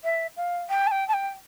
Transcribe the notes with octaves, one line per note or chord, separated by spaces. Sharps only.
E5
F5
G5
A5
G5
A5
G5